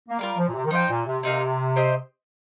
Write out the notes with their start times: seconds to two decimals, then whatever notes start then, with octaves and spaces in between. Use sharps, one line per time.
0.08 A#3
0.19 G3 F4 A#4 F5
0.37 F3
0.48 A#2
0.53 C3
0.65 D#3
0.71 F3 D#4 C5 G5
0.89 A#2
1.06 C3
1.23 C3 C4 D#4 A#4 F5
1.76 C4 G4 C5 D#5